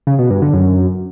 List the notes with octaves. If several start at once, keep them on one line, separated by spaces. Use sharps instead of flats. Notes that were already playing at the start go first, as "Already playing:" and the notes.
C#3
B2
G2
D3
F#2